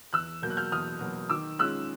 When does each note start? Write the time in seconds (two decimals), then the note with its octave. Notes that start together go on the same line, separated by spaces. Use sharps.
0.13 E2 E6 F#6
0.42 B2 F#3 A#3 G6
0.50 F#6
0.57 F6 G6
0.72 E2 D#6 F6
1.00 B2 F#3 A#3
1.30 D#3 D6 E6
1.59 G#3 C#4 F4 E6 F#6